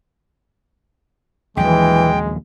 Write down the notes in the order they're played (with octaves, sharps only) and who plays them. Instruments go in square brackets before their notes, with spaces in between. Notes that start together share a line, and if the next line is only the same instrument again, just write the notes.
[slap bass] A#1 D#2 F#3 [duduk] E3 [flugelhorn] G#3 [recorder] G5